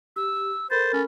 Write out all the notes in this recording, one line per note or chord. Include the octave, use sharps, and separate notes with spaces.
G4 E6
A4 A#4 C5 B5 A6
C#4